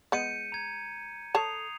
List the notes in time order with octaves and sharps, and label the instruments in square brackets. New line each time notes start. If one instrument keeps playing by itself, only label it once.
[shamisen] G#3 B3 [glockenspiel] G6 C#7 D#7
[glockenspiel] A#5 G#6
[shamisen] A4 C#5 A5 [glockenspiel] D#6 C7 F7